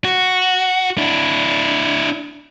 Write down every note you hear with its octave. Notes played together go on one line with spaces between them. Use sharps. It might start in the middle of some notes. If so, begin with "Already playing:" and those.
F#4
D4 E4